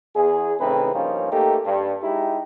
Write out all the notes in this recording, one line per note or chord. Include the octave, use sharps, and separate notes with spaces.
E2 G#4
A2 C#3 E3 C4 D#4 B4
G2 F3 A#3 C#4 D#4 F4
A3 A#3 D#4 G4 A4
G2
G#3 D#4 E4 G4